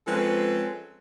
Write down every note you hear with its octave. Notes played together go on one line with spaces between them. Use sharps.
F3 G#3 C4 C#4 A4 B4